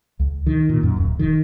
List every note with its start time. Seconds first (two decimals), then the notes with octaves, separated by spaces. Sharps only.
0.19 C#2
0.46 D#3
0.69 A#2
0.83 F#2
0.97 D1
1.19 D#3